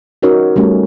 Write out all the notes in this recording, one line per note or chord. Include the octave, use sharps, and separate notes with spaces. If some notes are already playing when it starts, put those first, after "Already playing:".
C#4 D#4 F#4 A#4 C#5
G3 A3 C#4